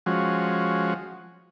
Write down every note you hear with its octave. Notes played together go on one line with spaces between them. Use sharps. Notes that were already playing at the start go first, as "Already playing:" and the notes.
F3 G#3 C#4 F#4